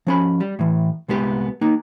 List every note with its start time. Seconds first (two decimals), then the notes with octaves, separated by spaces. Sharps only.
0.07 F3 C#4 B5
0.40 G3
0.59 A2 E3
1.09 C2 G#3 B3 G4
1.61 A#3 D#4